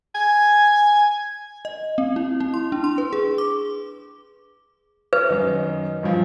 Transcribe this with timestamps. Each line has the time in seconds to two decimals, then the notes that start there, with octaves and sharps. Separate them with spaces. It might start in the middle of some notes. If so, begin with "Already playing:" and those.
0.15 G#5
1.65 D#5
1.98 C4
2.16 E4
2.40 E4
2.54 C6
2.72 D4
2.84 C6
2.98 B4
3.13 G#4
3.38 D6
5.13 B4
5.29 F#2 D#3 D#4
6.03 G2 A#2 F3